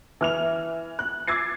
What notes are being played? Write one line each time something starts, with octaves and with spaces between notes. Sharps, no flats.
E3 F6 F7
F#6
D6 E6 G#6 A6 C7